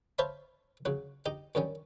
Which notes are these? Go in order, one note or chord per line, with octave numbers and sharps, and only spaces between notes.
C5 C#5 E5 F5 A5 B5
C#3 F#3 F#4
D#4 G4 D#5
F#2 D#3 G3 C#4